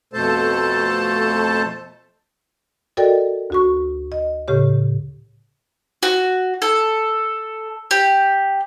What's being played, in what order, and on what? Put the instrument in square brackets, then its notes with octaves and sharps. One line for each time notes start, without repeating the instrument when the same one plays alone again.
[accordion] F2 B2 A3 A4 C5 A5
[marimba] F#4 A4 A#4 D5 D#5 G5
D2 F#4 C#6
D#5
A2 C#3 G4 C#5
[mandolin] F#4
A4
G4